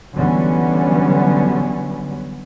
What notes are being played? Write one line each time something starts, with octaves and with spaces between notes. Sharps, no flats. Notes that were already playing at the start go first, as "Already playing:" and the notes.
D3 E3 F#3 G3 B3 C#4